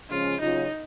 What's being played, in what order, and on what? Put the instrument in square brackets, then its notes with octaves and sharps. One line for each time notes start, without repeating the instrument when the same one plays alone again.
[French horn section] C#3 F3 G#3 C#4 [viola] F4
[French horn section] C#3 F#3 C#4 F4 [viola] D#4